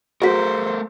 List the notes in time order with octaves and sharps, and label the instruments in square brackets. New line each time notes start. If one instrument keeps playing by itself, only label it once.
[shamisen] F#3 F#4 [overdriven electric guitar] A3 A#4 [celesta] G#4 B6 [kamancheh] C5